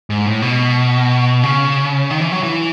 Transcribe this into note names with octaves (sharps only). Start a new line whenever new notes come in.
G#2
A2
B2
C#3
D#3
E3
F#3
E3